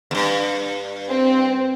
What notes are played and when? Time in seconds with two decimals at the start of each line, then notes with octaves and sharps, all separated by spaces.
0.11 E2 G2
1.09 C4